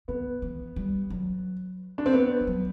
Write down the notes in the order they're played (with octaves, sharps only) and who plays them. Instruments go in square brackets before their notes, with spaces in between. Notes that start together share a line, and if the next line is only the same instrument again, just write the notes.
[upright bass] D3 [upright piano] B3
[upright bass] E3
G3
F#3
[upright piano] D4
C4
B3
[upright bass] E3
F#3